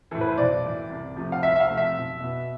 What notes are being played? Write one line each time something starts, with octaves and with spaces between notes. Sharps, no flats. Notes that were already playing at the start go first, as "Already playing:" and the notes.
A2 E3 A4
B4
C5
B1 D5
A2 E3
C2
C3 F3 A3
F5
C2 E5
E5
F5
C3 F3 A3
E5
B1
B2 B3